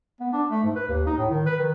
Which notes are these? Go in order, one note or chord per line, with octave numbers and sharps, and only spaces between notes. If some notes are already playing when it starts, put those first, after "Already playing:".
B3
D4
A3
G#2
B4
D#2
D#4
A2
D#3
B4
D#3